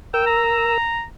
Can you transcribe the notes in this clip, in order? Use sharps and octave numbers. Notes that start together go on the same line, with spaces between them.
A#4 G5 E6
A#5